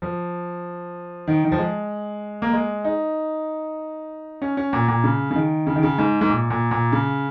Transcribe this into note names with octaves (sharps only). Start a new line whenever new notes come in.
F3
D#3
D#3
F3
G#3
A#3
G#3
D#4
C#4
C#4
A#2
A#2
C#3
C#3
D#3
C#3
D#3
C#3
G#2
G#2
A#2
A#2
A#2
C#3